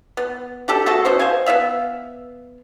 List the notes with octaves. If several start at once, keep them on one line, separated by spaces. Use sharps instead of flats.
B3
D4 G4 A4
A3 F#4 G#4 A4
B2 C#4 C5
C5 D#5 F5 G#5
B3 E4 E5 F5